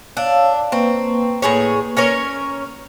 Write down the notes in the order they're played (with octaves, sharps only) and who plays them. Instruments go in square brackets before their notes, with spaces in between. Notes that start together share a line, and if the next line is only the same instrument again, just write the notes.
[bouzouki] D4 [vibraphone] C#5 F5 E6
[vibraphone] A#3 B4 C#6 [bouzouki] C4
[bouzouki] A2 G#4 C#5
C#4 A#4 C#5